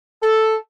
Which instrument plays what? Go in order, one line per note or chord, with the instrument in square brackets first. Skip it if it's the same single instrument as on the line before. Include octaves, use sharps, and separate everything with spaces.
[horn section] A4